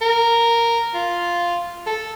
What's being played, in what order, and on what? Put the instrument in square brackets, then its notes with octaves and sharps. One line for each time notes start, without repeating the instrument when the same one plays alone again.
[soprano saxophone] A#4
F4
A4